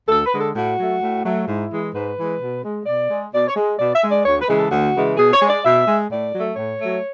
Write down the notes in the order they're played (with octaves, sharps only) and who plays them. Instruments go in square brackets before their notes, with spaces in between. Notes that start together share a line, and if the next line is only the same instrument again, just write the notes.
[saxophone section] D2 A4
B4
D3 G#3
A4
A2 F#4
F#3 A3
A2
F#3 A3
G#2 E4
E3 G#3
G#2 B4
E3 G#3
B2
G#3
B2 D5
G#3
B2 D5
C#5
G#3
B2 D5
E5
G#3
D5
D2 C#5
B4
C#3 E3 G#3
A4
D2 F#4
C#3 E3 G#3
B2 G#4
C#5
G#3
D5
B2 E5
G#3
A2 D5
F#3 A3
A2 C#5
F#3 A3